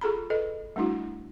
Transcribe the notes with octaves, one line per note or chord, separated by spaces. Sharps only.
F4 G#4 A4 A#5 B5
A4 B4 D#5
G3 A3 D4 E4 F#4